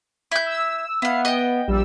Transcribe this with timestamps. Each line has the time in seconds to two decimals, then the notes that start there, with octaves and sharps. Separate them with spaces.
0.32 E4 G6
0.46 E6
1.02 B3 E4 F5
1.25 D#5 G5
1.68 A#1 G3 E6